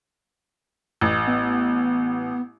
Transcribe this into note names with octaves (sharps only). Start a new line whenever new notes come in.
A1
B3